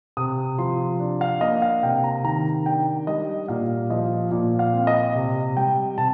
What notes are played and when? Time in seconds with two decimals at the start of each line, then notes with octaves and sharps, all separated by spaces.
0.17 C3 D#6
0.58 F3 C6
1.00 D4
1.21 F5
1.41 A#3 D#5
1.62 F5
1.83 C3 G5
2.04 A#5
2.24 D#3 A#5
2.66 D4 G5
3.07 G3 D#5
3.48 A#2 F5
3.90 F3 D#5
4.32 A#2
4.59 F5
4.73 C4
4.87 D#5
5.15 C3
5.57 G3 G5
5.98 C3 A5